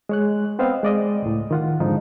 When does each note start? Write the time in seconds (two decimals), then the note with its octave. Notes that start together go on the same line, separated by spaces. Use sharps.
0.09 G#3 C#5 F#6
0.59 B3 C4 C5 D#5 F5
0.83 G#3 D5 D#5
1.22 C#2 A2
1.51 D#3 F4 F#5
1.80 F2 G#2 D3 F3 D#4